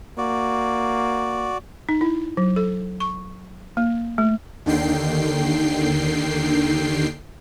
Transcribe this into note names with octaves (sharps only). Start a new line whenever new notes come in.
A#3 F#4 D5
D#4
E4
F#3
A4
C#6
A#3
A3
D#2 D3 D#3 G5 C7